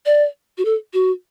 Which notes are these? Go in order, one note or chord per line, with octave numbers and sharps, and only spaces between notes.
D5
F#4
A4
F#4